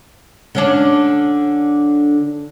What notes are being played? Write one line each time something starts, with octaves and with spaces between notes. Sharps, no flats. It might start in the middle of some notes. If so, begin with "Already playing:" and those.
D3 C#4 D4